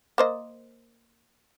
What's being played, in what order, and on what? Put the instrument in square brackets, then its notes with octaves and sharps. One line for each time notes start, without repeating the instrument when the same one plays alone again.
[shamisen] A#3 C5 D#5